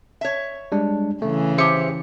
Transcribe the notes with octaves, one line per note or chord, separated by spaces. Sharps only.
C#5 E5
G3 G#3 D4
C#3 E3 A3
G4 G#4 C5 E5 C#7